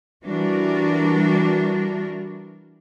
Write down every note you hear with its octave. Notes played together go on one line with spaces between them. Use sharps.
E3 G3 D4 F#4 A#4